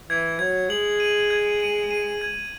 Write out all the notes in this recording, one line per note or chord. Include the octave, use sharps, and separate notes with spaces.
E3 G#6
F#3 G#6
G#3 F#7
D#7
G#6
D#7
D#7
G#6